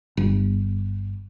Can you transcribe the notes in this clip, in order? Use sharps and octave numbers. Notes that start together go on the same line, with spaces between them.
G1